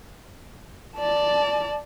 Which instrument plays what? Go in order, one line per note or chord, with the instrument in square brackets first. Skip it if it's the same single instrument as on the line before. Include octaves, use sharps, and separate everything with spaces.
[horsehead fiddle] D5 A5